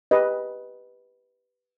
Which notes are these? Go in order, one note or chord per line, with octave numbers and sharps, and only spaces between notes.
G4 B4 D#5